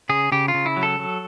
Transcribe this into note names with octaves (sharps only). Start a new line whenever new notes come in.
C#3 G#4
C#3 G4
F4
C#3
E4
F#3
A4
F#3